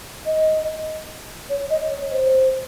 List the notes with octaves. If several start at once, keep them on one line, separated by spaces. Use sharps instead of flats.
D#5
C#5
D#5
C#5
C5